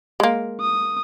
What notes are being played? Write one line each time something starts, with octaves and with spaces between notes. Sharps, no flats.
G#3 A#3
D#6